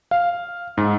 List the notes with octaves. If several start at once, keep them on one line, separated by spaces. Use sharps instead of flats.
F5
G#2